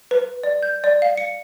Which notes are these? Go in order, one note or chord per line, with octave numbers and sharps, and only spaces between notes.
B4
D5
G6
D5
F5
C#7